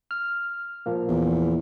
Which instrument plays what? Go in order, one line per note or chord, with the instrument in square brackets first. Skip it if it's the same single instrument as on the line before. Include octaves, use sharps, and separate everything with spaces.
[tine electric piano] F6
A#2 F3 A#3
[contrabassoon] E2